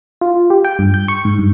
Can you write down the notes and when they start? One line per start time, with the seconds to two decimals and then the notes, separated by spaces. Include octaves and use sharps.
0.21 F4
0.50 G4
0.64 G5
0.79 G2
0.94 G6
1.08 C#6
1.25 G#2
1.39 G2